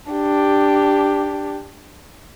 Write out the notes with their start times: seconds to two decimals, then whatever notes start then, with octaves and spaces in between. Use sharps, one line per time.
0.11 D4 G4